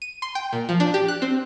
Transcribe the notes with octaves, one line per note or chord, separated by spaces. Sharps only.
D#7
C6
G5
A#2
F3
D4
G4
F#6
C4